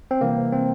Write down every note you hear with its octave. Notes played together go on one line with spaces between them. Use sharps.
C4
C3 E3 G3 A#3
C4